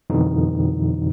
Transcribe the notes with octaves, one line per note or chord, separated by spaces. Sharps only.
F2 B2 D3 E3 F#3 D#4